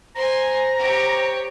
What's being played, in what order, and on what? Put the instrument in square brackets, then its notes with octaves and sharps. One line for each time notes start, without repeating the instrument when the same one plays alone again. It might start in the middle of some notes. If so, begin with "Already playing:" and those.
[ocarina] C5 [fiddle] G#5 C6 [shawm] A#5
[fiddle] G4 C#5